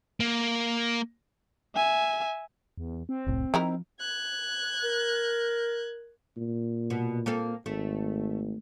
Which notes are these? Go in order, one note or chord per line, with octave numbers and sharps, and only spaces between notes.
A#3
E5 G#5
E2
C4
E1 C2 A2
D#3 F3 E4 A#4
F#6 G#6
A#4
A#2
B2
A#3 C4 A4
G#1 A3